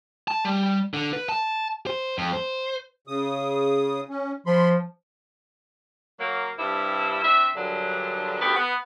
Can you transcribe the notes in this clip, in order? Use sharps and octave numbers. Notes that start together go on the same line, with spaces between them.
A5
G3
D3
B4
A5
C5
F2
C5
C#3 D#6
C#4
F3 B5 C6
F#3 A#3
G2 C3 D4 E4
C4 D4 E5
G2 A#2 D3 F#3
D2 D#3 B3 G4
B3